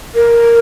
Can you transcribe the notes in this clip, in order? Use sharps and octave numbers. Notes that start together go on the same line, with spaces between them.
A#4